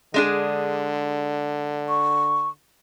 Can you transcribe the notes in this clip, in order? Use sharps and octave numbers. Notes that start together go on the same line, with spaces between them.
D3 G#3 D4 G#4
C#6